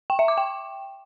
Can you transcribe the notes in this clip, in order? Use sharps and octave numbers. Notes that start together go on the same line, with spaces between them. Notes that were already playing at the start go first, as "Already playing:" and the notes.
G5
E5
D6
G5